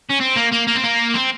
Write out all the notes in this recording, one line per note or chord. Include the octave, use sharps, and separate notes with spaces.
C#4
C4
A#3
A#3
A#3
C4
A#3
C4